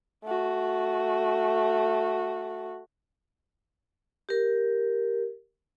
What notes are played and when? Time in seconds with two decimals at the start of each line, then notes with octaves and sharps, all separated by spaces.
0.24 A3 F#4
4.29 G4 A#4